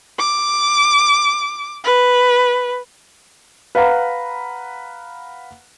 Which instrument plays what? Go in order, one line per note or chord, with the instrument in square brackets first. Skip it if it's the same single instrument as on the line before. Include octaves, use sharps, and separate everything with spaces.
[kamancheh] D6
B4
[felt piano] B4 F5 F#5 A#5 B5